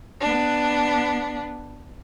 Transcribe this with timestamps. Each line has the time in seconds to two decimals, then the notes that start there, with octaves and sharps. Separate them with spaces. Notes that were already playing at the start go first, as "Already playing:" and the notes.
0.20 B3 D4